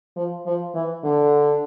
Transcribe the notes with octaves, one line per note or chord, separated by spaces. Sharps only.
F3
F3
E3
D3